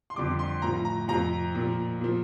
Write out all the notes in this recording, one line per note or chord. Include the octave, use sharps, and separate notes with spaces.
C6
F2 D3 G3 D6
C6
A2 F3 A#5
A#5
F2 C3 F3 A#5
A#2 F3
A#2 F3